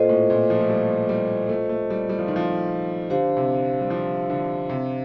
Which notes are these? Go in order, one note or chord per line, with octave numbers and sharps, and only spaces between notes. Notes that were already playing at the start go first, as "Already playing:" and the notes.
Already playing: A#2 F4 A4 C5 D#5
A2
A#2
F3
A3
G3
G3
A3
A3
G3
G3
F3
D#3
F3
D3 D4 G4 C5 F5
C3
G3
F3
D3
C3